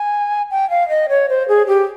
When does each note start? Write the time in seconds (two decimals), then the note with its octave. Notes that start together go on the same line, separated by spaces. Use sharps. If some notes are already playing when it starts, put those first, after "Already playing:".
Already playing: G#5
0.51 G5
0.70 F5
0.89 D#5
1.09 C#5
1.29 C5
1.48 G#4
1.67 G4